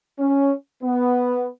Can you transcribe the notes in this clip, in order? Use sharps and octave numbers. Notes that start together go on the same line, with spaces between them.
C#4
B3